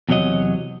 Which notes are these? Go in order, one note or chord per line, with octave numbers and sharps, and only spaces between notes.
E2 C3 F#3 C#5 D#5